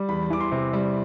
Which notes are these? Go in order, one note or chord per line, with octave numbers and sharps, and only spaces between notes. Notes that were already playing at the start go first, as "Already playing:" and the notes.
Already playing: G3
E2 B5
E3 D6
C6
C3
G3